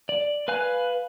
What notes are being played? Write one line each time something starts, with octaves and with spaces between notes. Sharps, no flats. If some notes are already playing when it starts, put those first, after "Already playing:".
D5
B4 F5 G#5 F#6